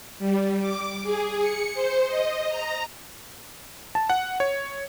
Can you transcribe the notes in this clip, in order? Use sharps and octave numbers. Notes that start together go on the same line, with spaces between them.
G3
D6
G#4
C#7
C5
D#5
A#5
A5
F#5
C#5